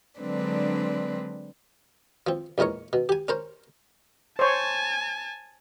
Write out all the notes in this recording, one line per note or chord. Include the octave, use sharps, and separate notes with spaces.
D3 F#3 G#3 C4 D4 B4
F3 C4
A#1 E2 G#3 A#4 C#5
B2
G4 G#5
C#4 A#4 C5
C5 C#5 G#5 A5